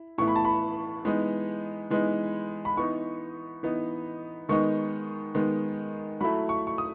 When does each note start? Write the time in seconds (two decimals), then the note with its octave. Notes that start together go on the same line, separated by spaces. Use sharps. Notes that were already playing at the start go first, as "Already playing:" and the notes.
Already playing: E4
0.18 A2 E3 B3 E4 C#6
0.28 B5
0.36 A5
0.45 B5
1.05 E3 G#3 B3 D#4
1.90 E3 G#3 B3 D#4
2.65 B5
2.77 E3 B3 D#4 C#6
3.63 E3 B3 D#4
4.49 D#3 G#3 B3 D#4 C#6
5.35 D#3 G#3 B3 D#4
6.21 F#3 A3 E4 B5
6.49 C#6
6.67 C#6
6.78 D#6